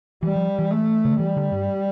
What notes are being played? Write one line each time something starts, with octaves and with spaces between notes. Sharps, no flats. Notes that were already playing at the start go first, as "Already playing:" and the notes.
E3 G3
F3
E3
A3
C#3
D3
E3 G3
D3
G2